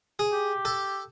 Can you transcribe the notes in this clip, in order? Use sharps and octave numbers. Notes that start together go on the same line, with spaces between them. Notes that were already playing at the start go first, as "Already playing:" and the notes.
G#4
G4
A4